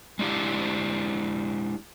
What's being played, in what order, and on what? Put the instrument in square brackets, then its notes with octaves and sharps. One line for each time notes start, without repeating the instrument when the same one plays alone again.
[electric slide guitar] G#3 D4 E4 G4 F5